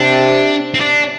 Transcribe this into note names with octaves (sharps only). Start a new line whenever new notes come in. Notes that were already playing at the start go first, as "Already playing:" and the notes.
Already playing: C3 D4
C4
D4